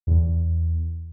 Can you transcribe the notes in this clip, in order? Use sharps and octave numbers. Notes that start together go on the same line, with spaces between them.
E2